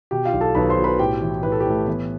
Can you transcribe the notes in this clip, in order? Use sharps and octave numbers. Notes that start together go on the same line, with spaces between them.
B2 G4 G5
F4 F5
B1
A4 A5
B1 B4 B5
C5 C6
B2
B4 B5
A2 G4 G5
E3
A2 B4
A4
G4
A2 A3 A4
E3 B3 B4